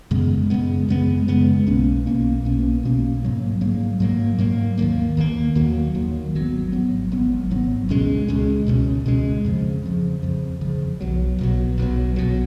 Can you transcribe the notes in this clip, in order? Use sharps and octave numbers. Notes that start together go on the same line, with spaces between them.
F#2 C#3 G#3 B3
F#2 C#3 G#3 B3
F#2 C#3 G#3 B3
F#2 C#3 G#3 B3
B1 B2 A#3 C#4
B1 B2 A#3 C#4
B1 B2 A#3 C#4
B1 B2 A#3 C#4
G#2 F#3 A#3
G#2 F#3 A#3
G#2 F#3 A#3
G#2 F#3 A#3
D#2 D#3 F#3 A#3
D#2 D#3 F#3 A#3
D#2 D#3 F#3 A#3
D#2 D#3 F#3 A#3
G#1 G#2 F#3 B3
G#1 G#2 F#3 B3
G#1 G#2 F#3 B3
G#1 G#2 F#3 B3
C#2 B2 G#3 C#4
C#2 B2 G#3 C#4
C#2 B2 G#3 C#4
C#2 B2 G#3 C#4
F2 C#3 F3
F2 C#3 F3
F2 C#3 F3
F2 C#3 F3
B1 B2 F#3
B1 B2 F#3
B1 B2 F#3
B1 B2 F#3